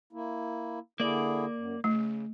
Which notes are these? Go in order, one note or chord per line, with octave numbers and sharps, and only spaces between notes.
A#3 E4
D3 A#3 E4 G#4 D5
F#2
C#3 A3